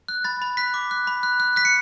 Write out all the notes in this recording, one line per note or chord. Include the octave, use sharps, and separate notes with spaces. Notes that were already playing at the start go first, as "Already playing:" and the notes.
F#6
B5 A6
B5
F#6 B6
D6
F#6
B5
F#6
F#6
F#6 B6
C#7